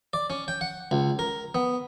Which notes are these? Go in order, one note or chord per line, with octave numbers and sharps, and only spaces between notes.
D5
C#4
G5
F#5
C#2
A#4
B3